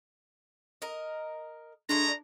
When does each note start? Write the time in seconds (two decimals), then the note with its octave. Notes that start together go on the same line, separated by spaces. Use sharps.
0.82 A#4 D#5
1.89 G#3 A3 D4 E4 A#5